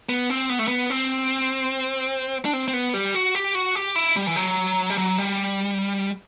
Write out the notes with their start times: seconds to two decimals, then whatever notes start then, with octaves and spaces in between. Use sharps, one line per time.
0.09 B3
0.30 C4
0.49 B3
0.59 A3
0.68 B3
0.90 C4
2.45 D4
2.53 C4
2.68 C4
2.74 B3
2.94 G3
3.15 F#4
3.35 G4
3.55 F#4
3.75 G4
3.95 E4
4.16 G3
4.27 E3
4.36 F#3
4.90 G3
4.98 F#3
5.18 G3